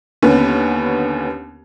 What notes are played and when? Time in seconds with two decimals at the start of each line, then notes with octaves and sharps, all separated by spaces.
0.22 D#2 D3 B3 C#4